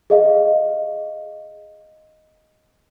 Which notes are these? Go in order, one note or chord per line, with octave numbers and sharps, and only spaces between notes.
G#4 D#5 F5